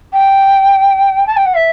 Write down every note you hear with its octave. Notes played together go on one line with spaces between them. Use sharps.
G5
A5
G5
F#5
E5